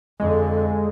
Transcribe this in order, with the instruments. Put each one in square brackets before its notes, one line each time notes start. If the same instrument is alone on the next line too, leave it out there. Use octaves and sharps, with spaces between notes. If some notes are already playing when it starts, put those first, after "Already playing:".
[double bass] F2 D3 [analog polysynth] G#3